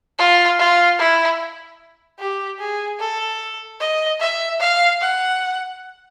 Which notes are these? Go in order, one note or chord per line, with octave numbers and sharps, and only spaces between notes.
F4
F4
E4
G4
G#4
A4
D#5
E5
F5
F#5